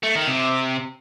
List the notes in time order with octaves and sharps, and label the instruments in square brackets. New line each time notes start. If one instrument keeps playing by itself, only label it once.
[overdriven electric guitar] A3
D#3
C3